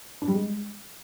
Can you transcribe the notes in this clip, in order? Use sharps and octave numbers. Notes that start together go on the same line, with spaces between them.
D4
G3
G#3